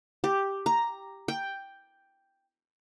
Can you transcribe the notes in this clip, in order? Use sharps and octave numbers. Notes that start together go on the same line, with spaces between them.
G4
A#5
G5